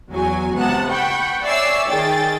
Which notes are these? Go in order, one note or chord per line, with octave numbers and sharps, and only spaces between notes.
E2 F#3 G#5
C#2 C3 B3 F#5 A5
F#5 G5 B5 C#6 G6
C#5 D5 E5 G#5 E6 C7
D#3 G#4 G5 A6